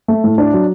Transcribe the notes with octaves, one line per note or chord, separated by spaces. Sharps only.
A3
A2
D4
F#3